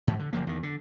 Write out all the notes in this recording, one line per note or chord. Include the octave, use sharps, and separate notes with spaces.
G#2 E3
D3
F#1 F3 A#3
E2 D#3
D3